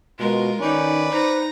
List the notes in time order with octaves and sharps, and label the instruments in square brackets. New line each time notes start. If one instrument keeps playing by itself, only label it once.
[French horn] B2 [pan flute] G#3 [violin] F4 A#4
[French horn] D#3 [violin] C#4 [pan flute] D#4 [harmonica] B4 D5
[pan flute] D#4 [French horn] C5 [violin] A#5 A#6